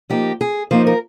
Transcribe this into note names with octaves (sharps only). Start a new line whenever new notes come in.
F3 A#3 D#4 G4
G#4
F3 A#3 D#4 C5
A#4